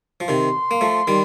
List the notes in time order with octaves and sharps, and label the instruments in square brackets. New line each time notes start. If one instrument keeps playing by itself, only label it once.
[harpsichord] F3
[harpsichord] C3 D#3 [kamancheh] C6
[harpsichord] A#3
F3 A3
D#3 G3